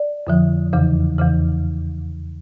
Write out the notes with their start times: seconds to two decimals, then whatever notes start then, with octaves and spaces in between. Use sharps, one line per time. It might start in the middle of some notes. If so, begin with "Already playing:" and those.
Already playing: D5
0.27 F2 D3 F3
0.73 E2 C#3 E3
1.18 E2 C#3 E3